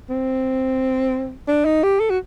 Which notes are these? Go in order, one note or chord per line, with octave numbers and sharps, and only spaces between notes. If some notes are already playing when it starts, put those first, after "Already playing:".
C4
D4
D#4
G4
A4
F#4